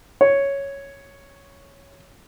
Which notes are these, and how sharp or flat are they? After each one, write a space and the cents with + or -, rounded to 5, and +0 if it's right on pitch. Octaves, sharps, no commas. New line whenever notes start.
C#5 +0